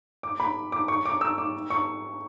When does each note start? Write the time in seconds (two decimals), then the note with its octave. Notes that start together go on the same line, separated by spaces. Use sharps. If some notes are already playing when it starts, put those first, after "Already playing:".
0.23 D6
0.40 B5
0.72 D6
0.88 C#6
1.05 D6
1.21 E6
1.38 D6
1.70 C#6